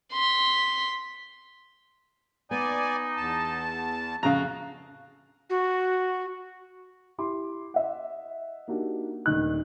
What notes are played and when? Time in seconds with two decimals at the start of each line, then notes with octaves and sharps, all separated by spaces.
0.13 C6 B6
2.51 B3 D#4 D5 G#5
3.17 E2 A5
4.23 F2 C#3 F#4 F5 A#5
5.50 F#4
7.18 E4 G4 C6 D6
7.74 D#5 E5 F#5
8.68 A#3 D4 D#4 F#4 G4
9.26 D#1 D#3 A3 D4 D#4 F#6